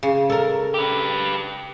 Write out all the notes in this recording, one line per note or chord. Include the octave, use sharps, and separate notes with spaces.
C#3
A4 A#4
G4 B4